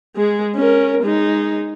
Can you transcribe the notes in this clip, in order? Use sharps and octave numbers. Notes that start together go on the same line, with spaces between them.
G#3 G#4
C#4 A#4
G#3 D#4